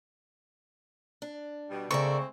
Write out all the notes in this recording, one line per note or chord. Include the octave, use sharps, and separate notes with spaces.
D4
B2 G3
C#3 G#3 A3 C4 A4 A#4 D5 C#6